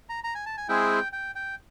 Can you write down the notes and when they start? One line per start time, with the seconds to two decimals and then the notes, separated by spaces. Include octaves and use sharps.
0.09 A#5
0.24 A#5
0.35 G#5
0.46 A5
0.57 G#5
0.68 G#3 C4 E4 G#4 G5
1.13 G5
1.35 G5